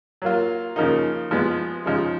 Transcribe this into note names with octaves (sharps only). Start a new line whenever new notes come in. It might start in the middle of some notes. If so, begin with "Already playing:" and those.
F#3 A#3 F4
C#3 F3 A#3 D#4
F3 G#3 B3
C#3 F3 G#3 D#4